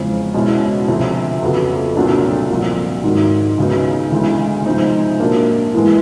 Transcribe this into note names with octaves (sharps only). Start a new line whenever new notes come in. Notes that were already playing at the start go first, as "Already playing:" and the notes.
Already playing: E2 C#3 F3 G#3 C4
B2 G#3 C#4 E4
D2 C3 F3
F2 C#3 F#3 B3
C2 A#2 F#3 A3 D4
C2 A#2 F3
G#2 D#3 F#3
C#2 C#3 F#3 B3 D#4
D2 C#3 E3 G#3
C3 F3 G#3 C4 D#4
A#2 F#3 A#3 D4
A2 E3 G#3 B3